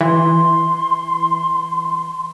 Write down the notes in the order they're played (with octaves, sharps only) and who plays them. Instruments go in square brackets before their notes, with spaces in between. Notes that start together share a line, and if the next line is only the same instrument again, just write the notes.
[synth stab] E3 [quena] C6